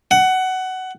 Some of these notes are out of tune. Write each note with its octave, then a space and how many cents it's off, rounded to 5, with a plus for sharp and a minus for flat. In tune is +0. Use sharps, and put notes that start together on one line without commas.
F#5 +15